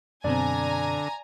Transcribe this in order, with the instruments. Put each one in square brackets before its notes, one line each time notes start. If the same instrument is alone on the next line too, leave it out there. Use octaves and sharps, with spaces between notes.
[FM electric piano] F#2 B2 C4 [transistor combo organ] D3 [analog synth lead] D5 [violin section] G#5 A#5